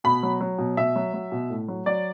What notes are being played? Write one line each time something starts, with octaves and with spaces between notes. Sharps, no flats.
B2 B5
F#3
F#3
B2
B2 E5
F#3
F#3
B2
A2
F#3
F#3 D5